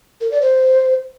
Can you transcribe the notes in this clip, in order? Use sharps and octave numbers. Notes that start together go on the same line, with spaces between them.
A#4
D5
C5